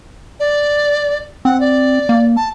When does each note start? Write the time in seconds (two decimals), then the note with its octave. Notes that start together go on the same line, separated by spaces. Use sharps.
0.40 D5
1.45 C4 F#5
1.60 D5
2.09 A#3
2.36 A5